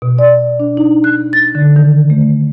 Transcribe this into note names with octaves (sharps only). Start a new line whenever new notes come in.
B2
D5
D4
D#4
F#6
A6
D3
D#3
A3